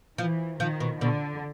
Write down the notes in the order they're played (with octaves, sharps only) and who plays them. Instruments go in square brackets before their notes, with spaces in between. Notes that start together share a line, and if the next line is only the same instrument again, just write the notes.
[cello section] E3 [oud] F3
[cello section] D#3 [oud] F3
[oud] B2
[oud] B2 [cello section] D3